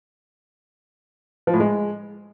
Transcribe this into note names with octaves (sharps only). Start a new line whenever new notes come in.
F3
A2
G#3